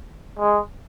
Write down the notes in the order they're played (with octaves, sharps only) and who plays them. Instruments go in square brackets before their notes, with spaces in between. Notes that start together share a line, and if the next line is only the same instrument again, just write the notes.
[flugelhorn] G#3